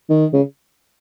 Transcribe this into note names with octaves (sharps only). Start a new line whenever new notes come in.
D#3
C#3